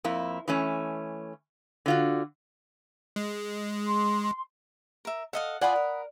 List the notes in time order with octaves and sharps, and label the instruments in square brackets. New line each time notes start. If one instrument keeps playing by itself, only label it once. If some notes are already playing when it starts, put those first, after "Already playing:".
[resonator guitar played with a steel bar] F2 A#3 E4
E3 A3 C#4
D3 F4 F#4
[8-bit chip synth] G#3
[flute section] C6
[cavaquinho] A#4 E5
[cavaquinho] A4 D#5 F5 [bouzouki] F#5
[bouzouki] F4 D5 G#5 [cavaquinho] F#5 B5 D#6
[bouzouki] A#4